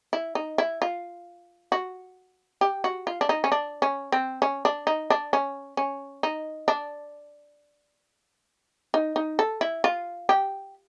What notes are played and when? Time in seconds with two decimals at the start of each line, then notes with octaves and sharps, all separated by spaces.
0.13 E4
0.35 D#4
0.58 E4
0.82 F4
1.72 F#4
2.61 G4
2.84 F#4
3.07 F4
3.21 D4
3.29 D#4
3.44 C#4
3.52 D4
3.82 C#4
4.12 C4
4.42 C#4
4.65 D4
4.87 D#4
5.10 D4
5.33 C#4
5.77 C#4
6.23 D#4
6.68 D4
8.94 D#4
9.16 D#4
9.39 A4
9.61 E4
9.84 F4
10.29 G4